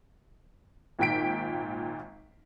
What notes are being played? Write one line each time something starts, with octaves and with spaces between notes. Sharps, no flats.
G#1 A#2 D#3 G5 B6 D7